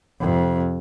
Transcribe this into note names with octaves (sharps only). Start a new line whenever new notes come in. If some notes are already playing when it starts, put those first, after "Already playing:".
F2 C3